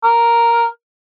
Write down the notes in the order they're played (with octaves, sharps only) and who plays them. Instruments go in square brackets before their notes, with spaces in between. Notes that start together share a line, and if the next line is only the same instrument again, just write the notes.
[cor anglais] A#4